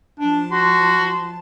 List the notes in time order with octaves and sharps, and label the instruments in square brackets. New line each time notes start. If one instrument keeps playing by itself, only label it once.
[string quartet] F3 A5 [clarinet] D4
[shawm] F#4 [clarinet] C6